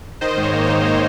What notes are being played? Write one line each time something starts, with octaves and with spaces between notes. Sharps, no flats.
D#3 C5 D#5
G#2
C#5
A#3
C5
D#4
D#3 C#5